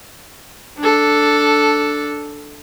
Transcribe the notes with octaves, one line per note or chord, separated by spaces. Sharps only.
D4 A4